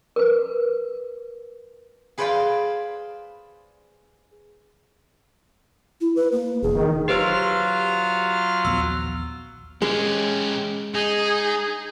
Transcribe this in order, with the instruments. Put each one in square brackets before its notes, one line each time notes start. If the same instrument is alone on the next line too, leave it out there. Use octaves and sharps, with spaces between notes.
[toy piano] A#4 B4
[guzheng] G#4 B4 C5 D5 F5 G5
[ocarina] E4
B4
A#3
[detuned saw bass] E1 [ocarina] G#4
[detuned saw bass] D#3
[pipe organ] F#3 F4 F6 [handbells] G4 B4 C5
[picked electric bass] A#1 D#2 B3 [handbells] E6
[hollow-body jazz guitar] G#3 [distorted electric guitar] C#4 G4
[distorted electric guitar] D#4 [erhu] G#4